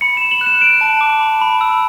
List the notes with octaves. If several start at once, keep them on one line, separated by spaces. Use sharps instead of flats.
B5 C#7
E7
B5
F#7
F#6
E7
F#6 D7
A5
D6
B5
B5
E6